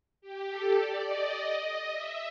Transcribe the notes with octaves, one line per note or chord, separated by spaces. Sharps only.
G4
A4
D5
D#5
E5